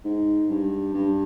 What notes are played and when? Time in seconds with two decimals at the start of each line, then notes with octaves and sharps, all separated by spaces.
0.05 G#2
0.50 G2
0.94 G2